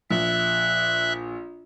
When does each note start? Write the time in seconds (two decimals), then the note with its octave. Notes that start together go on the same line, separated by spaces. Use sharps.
0.11 A#1 E5 F#6